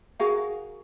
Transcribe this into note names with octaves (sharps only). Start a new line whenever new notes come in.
F#4 G#4 A#4 F5